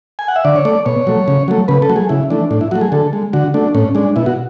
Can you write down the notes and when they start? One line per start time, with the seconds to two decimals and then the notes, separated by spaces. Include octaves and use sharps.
0.19 G#5
0.28 F#5
0.36 E5
0.45 D3 D5
0.56 C#5
0.65 A3 D5
0.86 B2 C#5
1.07 F#3 A3
1.28 C#3
1.48 F#3 A3
1.68 C#3 B4
1.82 A4
1.90 F#3 A3
1.96 G#4
2.09 C#3 E4
2.30 E3 A3 D4
2.51 A2 D4
2.61 E4
2.71 F#3 A3 F#4
2.81 G#4
2.92 D3 A4
3.13 G#3
3.33 D3 F#4
3.54 A3 D4
3.75 A2 C#4
3.95 G#3 D4
4.16 B2 E4
4.26 F#4